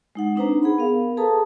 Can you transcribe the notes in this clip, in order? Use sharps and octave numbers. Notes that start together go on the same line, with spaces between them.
G#3 D#4 F#5
C4 D4 D#4 B4 C5 A#5
G#4 F#5 B5
B3 A#4 F5
G#4 A4 B4 A5 A#5 D#6